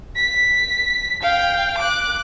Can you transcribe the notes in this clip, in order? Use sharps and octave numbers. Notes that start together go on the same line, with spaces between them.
B6
F5 G5
D6 F#6